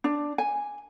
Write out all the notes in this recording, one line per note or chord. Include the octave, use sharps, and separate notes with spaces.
D4
G#5